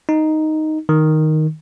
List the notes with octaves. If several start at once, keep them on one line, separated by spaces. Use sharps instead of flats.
D#4
D#3